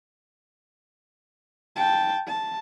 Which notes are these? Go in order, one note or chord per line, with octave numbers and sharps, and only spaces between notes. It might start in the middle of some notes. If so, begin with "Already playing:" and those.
G5 A5
A5